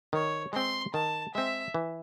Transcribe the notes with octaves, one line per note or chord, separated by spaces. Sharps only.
D#3 C#5
G#3 C4 C6
D#3 A5
G#3 C4 E5
E3